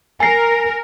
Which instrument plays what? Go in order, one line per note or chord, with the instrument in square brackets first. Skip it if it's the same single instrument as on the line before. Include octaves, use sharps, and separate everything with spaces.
[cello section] A#4 [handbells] G#5 C7